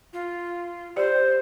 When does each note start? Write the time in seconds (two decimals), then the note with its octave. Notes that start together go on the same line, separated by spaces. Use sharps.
0.13 F4
0.96 G4 C5 D5